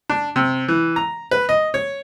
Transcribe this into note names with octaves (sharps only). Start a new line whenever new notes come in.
D4
C3
E3
A#5
B4
D#5
C#5